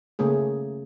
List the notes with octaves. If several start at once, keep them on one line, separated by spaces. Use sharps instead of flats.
C#3 A3 A#3 C#4 G#4